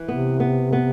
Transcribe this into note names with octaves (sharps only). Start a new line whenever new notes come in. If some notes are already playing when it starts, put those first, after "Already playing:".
Already playing: E3
C3 B3
B3
B3